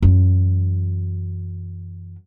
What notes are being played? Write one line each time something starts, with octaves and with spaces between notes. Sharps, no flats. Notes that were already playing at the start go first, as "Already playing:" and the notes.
F#2 E3